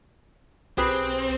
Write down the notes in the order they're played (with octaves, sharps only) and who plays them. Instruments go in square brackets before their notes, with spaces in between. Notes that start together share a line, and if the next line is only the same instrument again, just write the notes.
[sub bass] B1 [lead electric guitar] C4 [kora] G4 G#4 B4